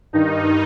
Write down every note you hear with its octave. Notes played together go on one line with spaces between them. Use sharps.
G2 D#3 D#4